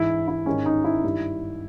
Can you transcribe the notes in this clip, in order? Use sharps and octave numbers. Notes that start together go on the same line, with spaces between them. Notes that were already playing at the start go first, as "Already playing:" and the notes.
Already playing: G#2 E3 E4
E4
G#2 D#3 C#4
D#4
E4
G2 D#3